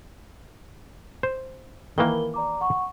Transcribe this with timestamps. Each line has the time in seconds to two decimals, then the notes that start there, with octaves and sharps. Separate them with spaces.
1.23 C5
1.98 D#3 E3 A#3 A#4 B5 G7
2.34 D5 A#5 D6
2.61 F#5 C#6